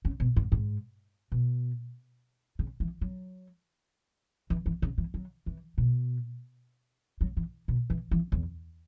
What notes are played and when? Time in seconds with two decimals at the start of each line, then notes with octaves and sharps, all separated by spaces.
0.05 C#3
0.20 B2
0.36 G#2
0.52 G#2
1.32 B2
2.59 C#3
2.80 E3
3.01 F#3
4.50 E3
4.66 E3
4.82 C#3
4.98 E3
5.14 F#3
5.46 E3
5.78 B2
7.21 F#3
7.37 E3
7.68 B2
7.90 E3
8.11 E3
8.32 E2